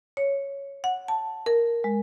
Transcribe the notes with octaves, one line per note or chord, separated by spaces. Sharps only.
C#5
F#5
A5
A#4
G#3